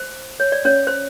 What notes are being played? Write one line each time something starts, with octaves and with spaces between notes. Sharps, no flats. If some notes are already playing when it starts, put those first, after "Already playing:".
Already playing: C5
C#5
D5
C#4 C#5
C5